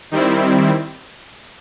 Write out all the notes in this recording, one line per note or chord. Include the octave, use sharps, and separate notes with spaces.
D#3 G3 C4 E4